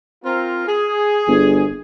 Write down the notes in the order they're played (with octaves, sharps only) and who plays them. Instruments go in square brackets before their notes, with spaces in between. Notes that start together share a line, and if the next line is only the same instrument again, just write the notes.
[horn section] C4 F4 A#4
G#4
[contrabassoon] G1